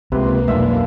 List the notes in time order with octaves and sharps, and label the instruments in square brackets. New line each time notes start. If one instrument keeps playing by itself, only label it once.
[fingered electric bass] C#2 G#3 [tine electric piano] C3 [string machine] A#3 [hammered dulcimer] B4 C6
[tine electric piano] B1 [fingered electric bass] F2 A3 [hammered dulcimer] D3 F4 E5